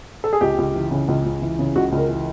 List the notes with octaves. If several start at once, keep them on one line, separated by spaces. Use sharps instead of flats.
A4
G#4
C#2 G4
C#2
E3
C#3
C#2
C#2
E3
C#3
C#2 F#4
C#2
A#4
E3